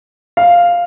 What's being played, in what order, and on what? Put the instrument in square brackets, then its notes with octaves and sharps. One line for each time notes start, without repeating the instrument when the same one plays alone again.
[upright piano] F5